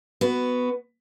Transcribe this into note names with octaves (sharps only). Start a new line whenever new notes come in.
B3 F#4